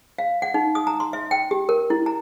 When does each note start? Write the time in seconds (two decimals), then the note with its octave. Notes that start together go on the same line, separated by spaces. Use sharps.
0.19 F5
0.42 F#5
0.54 D#4
0.75 D#6
0.87 A#5
1.00 C6
1.13 E5
1.31 G5
1.51 G4
1.69 A#4
1.90 E4
2.06 A#5